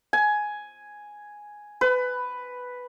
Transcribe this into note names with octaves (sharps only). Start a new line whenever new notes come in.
G#5
B4